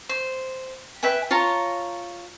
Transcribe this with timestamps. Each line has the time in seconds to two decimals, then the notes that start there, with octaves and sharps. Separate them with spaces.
0.09 C5
1.03 B4 E5 G5 G#5
1.31 F4 C#5 A5 A#5